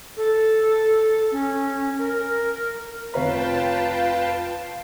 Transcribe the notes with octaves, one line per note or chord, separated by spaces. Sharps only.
A4
C#4
A#4
F1 F4 B4 C#5 F5 G5 A5 A#5